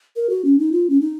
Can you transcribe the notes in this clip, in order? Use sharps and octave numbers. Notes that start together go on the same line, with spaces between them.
A#4
F#4
C#4
D#4
F4
C#4
D#4